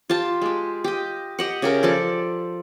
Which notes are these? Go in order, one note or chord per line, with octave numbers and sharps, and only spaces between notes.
F4 G4 A5
G#3 G4
G4 D#5
G4 D#5 F#5
C#3 G4 A#4 E5
F3 A4 D5